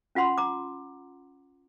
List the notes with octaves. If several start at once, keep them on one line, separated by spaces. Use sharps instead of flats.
C#4 F4 F#5 B5 C6
A#5 D6